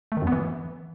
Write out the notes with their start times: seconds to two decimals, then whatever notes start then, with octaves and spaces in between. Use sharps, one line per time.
0.12 A3
0.17 D#3
0.22 F#2
0.27 B3
0.32 E3